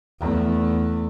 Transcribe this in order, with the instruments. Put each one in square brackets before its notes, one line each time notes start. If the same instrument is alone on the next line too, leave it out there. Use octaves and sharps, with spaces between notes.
[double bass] E2 A3